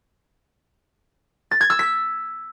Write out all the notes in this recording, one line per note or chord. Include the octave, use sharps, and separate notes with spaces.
A6
G#6
E6
B6